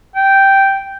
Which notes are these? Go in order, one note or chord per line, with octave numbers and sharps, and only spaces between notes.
G5